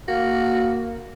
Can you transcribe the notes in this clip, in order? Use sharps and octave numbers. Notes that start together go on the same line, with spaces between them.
A#3 F#4 F5